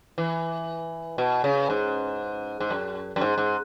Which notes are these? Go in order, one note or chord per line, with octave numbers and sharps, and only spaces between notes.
E3
B2
C#3
G#2
G#2
F#2
F#2
G#2
G#2